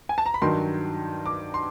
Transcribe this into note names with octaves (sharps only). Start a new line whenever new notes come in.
G#5
A5
A#5
B5
G2 D#3 F#3 C6
D6
C6